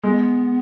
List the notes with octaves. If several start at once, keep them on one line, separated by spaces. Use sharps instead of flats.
G#3 B3